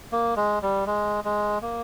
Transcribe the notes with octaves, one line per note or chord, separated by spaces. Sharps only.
A#3
G#3
G3
G#3
G#3
A#3